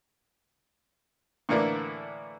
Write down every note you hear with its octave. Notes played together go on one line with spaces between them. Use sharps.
A2 D3 E3 A#3 D4 E4